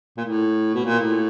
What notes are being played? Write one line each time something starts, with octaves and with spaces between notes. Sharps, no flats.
A#2
A2
B2
A#2
A2